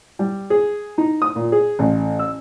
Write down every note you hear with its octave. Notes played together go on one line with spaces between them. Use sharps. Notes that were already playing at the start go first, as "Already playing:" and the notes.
G3
G#4
D#4
D#6
A#2
G#4
A1
E6